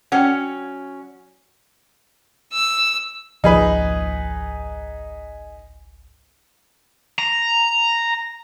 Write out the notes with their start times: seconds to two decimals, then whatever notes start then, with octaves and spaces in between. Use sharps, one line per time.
0.12 F#3 C#4 F#5 G5
2.53 E6
3.44 G#1 C#2 F3 D#4 G#4 B4
7.19 A#5